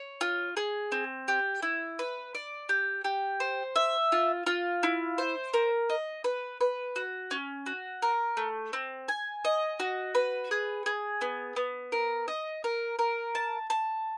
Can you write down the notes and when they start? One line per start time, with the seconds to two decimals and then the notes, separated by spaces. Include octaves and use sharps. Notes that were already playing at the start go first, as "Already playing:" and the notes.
Already playing: C#5
0.21 F4
0.57 G#4
0.92 C4
1.28 G4
1.62 E4
1.99 B4
2.35 D5
2.69 G4
3.04 G4
3.40 C5
3.76 E5
4.12 F4
4.47 F4
4.83 E4
5.18 C5
5.54 A#4
5.90 D#5
6.24 B4
6.61 B4
6.96 F#4
7.31 C#4
7.66 F#4
8.02 A#4
8.37 A3
8.73 C4
9.08 G#5
9.45 D#5
9.80 F#4
10.15 B4
10.51 G#4
10.86 G#4
11.21 B3
11.56 B3
11.92 A#4
12.28 D#5
12.64 A#4
12.99 A#4
13.35 A5
13.70 A5